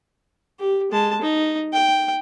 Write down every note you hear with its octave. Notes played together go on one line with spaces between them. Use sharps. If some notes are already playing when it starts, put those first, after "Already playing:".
G4
G#3 A5
D#4
G5